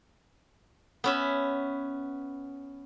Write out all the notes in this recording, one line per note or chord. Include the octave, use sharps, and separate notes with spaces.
B3 C#4 E5